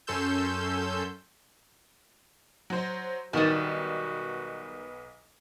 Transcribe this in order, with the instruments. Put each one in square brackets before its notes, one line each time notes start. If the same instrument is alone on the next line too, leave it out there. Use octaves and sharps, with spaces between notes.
[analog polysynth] F#2 C#4 A4 C6 E6 G6
[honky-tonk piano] F#3 C5
[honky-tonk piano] B1 B3 E7 [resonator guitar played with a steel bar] D#3 G3 [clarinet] F#4